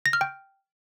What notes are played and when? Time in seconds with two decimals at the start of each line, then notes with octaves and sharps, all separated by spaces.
0.06 A#6
0.13 F6
0.21 G5